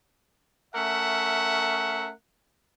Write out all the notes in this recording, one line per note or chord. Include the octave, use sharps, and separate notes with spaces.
A3 C#4 A#4 E5 F#5